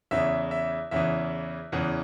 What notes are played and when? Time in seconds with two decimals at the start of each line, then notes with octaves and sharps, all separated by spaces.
0.11 E2 C#3 E3 E5
0.51 E5
0.91 E2 C#3 E3 E5
1.72 E2 C#3 E3